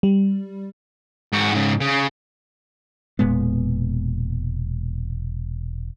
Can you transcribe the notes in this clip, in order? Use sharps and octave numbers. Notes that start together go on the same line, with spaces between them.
G3
G#2 F#4
G#2 C#3
C#3
E1 A#2 G#3 B3